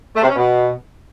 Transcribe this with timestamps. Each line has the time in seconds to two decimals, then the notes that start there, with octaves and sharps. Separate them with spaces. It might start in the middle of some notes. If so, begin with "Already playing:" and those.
0.15 A3
0.22 C3
0.29 C#4
0.36 B2